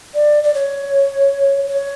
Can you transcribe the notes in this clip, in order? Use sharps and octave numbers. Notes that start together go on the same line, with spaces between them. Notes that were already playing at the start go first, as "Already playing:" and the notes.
D5
D5
C#5
C#5